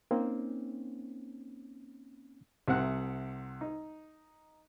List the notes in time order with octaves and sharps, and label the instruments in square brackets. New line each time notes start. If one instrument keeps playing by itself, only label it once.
[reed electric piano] A#3 C4 C#4 D#4
[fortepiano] C2 C3 C4 E5 F#5 F#6
D#4